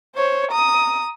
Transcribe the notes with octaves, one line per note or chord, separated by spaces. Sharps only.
C5 C#5
A#5 D#6